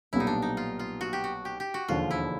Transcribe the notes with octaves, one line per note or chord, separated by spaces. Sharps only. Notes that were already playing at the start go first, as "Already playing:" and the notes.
B1 A#2 G3 B3 E4
D#4
D4
D#4
F4
F4
F#4
G4
F#4
G4
G4
F#4
E1 D#2 D3 F3 A#3 F4
E4